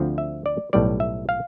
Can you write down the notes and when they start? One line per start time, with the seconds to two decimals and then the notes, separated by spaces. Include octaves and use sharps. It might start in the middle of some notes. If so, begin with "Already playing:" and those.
Already playing: D2 D3 F3 C4
0.18 E5
0.46 D5
0.73 B1 A2 G3 D5
1.00 E5
1.29 F5